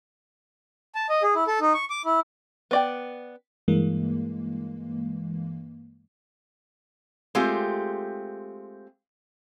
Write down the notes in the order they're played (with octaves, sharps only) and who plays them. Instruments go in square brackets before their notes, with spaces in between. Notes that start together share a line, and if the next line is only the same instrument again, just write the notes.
[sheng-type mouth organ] A5
D#5
G#4
E4
A4
D#4
C#6
D6
E4
[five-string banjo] B3 D5 G5
[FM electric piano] G2 E3 G#3 A#3
[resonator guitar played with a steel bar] G#3 A3 C4 F4 G4